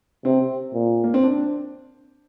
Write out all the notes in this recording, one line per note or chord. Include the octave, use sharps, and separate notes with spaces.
C3 C4
A#2
A#3
C4
D4